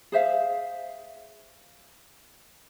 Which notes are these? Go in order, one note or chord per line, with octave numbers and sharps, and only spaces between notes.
G#4 C5 E5 F5